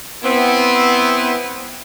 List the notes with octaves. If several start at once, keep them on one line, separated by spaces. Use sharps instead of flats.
B3 C4 E4